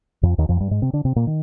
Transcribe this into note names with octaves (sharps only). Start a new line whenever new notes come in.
F2 F3
D#2 D#3
F2 F3
G2 G3
G#2 G#3
C3 C4
D3 D4
C3 C4
A#2 A#3
D#3